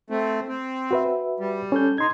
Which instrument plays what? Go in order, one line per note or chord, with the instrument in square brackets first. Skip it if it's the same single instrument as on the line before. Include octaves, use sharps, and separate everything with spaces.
[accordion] A3 C4
C4
[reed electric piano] F#4 B4 E5
[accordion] G3
[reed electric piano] C#4 A4 G6
[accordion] D#4 [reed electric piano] C6 G#6